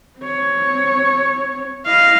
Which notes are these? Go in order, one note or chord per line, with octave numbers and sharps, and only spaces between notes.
C4 C#5
E4 D#5 F5